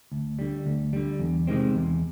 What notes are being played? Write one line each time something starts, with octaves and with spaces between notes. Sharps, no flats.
D2
D3 G3
D2
D3 G3
E2
C3 D#3 G#3 C4
E2